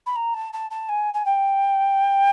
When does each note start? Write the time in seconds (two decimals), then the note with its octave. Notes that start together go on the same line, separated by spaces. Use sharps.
0.06 B5
0.15 A#5
0.34 A5
0.53 A5
0.70 A5
0.88 G#5
1.13 G#5
1.25 G5